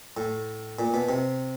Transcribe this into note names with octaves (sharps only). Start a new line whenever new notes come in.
A2
A#2
B2
C3